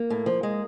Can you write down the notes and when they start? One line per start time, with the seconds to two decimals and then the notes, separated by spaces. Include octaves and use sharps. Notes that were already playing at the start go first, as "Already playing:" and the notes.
Already playing: A#3
0.10 A2
0.26 F3
0.43 G#3